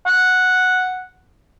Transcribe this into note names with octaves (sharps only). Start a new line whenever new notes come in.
F#5